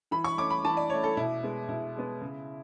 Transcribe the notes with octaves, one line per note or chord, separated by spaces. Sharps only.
E3 B5
C#6
A3 C#4 D6
B5
E3 A5
D5
A3 C#4 C#5
A4
B2 E4
G#3 B3
B2 E4
G#3 B3
C#3